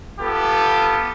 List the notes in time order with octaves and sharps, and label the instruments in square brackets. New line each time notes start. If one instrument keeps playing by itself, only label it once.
[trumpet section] B3 F4 G4 A4